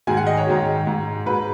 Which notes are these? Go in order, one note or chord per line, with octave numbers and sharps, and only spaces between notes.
G#2 D#3 G#3 G#5
F#5
D#5
C#5
G#2 D#3 G#3
G#2 G#3
G#2 G#3 B4